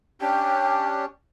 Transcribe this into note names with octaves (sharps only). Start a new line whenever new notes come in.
C#4 D4 G4 G5